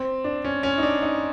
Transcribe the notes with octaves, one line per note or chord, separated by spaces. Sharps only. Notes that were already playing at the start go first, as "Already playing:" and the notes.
Already playing: C4
D4
C#4
C#4
D#4
D4
D#4